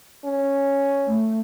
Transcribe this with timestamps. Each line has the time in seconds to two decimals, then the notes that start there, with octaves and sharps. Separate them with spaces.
0.25 C#4
1.07 A3